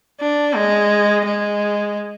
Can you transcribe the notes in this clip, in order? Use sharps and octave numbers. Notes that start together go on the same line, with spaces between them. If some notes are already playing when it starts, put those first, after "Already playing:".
D4
G#3
G#3